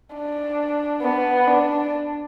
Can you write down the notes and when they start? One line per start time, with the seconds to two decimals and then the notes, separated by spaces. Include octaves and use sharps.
0.15 D4
1.02 B3
1.47 D4